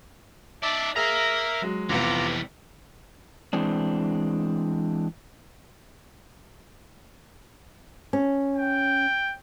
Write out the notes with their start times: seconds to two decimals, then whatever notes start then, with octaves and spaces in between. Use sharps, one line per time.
0.63 D#4 D5 E5 A5 D6
0.96 G#4 A#4 E5 F5 A#5
1.62 F#3 G#3
1.90 F1 E3 G3 B3 F4 A#5 D6
3.53 E3 G#3 C4 D4
8.13 C#4
8.57 G5